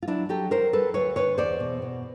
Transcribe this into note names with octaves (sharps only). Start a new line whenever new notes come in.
F4
F#3 D4 E4
F#3 G4 A4
F#3 A#4 C5
G3 A4 B4
D2 B4 C#5
D3 B4 C#5
E2 C5 D5
B2
B2